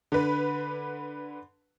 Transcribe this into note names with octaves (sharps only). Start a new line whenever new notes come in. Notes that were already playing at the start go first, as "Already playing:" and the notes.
D3 B4